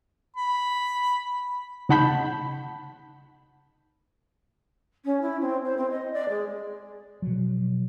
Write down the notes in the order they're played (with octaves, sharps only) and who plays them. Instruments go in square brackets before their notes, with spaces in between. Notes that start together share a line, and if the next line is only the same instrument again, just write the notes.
[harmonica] B5
[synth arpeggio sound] C#3 D#4 F#5 A5 B5 G6
[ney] C#4
E4
C4
C5
C4
D#5
D5
G#3
[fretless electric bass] B2 F3 F#3